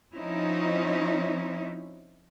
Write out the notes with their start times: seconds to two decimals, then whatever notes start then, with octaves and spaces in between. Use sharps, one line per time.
0.15 F3 C4 C#4 D#4 E4